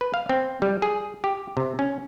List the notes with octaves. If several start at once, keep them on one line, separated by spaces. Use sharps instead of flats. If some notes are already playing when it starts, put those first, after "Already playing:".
B4
F5
C4
G3
G#4
G4
C3
C#4